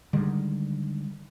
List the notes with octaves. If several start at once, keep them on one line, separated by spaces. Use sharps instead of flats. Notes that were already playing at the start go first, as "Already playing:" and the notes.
D3 D#3 G3 G#3